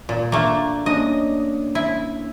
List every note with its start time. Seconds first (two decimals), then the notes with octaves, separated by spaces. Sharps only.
0.09 A#2
0.32 A3 A#3 D4 G#4
0.86 A#3 C#4 D4 D#5
1.75 E4